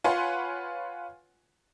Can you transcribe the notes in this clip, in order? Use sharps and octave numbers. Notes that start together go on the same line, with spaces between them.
F4 B4 C#5 F#5 G#5 C6